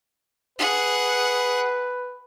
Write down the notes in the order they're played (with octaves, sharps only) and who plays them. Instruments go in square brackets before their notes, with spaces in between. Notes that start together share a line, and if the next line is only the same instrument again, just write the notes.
[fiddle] G#4 F#5 [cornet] B4